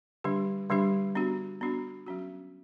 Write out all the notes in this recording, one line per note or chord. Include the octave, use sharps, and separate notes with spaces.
D3 G3 D4 G4
D3 G3 D4 G4
B3 D4 F#4
B3 D4 F#4
F#3 C#4 F#4